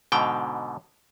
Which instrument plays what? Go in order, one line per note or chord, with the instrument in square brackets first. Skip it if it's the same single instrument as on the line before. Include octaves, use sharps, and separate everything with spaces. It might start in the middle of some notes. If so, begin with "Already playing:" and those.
[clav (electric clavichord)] G#2 B2 D3 G5